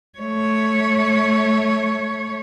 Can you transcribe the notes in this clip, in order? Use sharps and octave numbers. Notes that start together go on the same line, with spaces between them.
A3 C#5